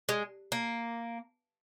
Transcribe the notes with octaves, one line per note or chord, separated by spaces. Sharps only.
G#3
A#3